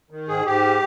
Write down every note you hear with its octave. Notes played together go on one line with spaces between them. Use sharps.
D#3
G#2 G#4
G#2 G4